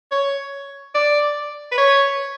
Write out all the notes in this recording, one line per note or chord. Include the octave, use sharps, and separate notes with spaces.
C#5
D5
B4
C#5